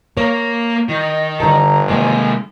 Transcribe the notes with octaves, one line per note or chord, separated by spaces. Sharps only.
A#3 A#4 C#5
D#3 D#5
G1 D3 G3 A4 A#5
C3 D#3 G#3 A#3 C4 G#5